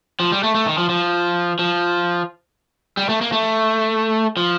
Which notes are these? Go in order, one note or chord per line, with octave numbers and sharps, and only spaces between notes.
F3
G3
A3
A3
D#3
F3
F3
F3
G3
A3
A#3
A3
F3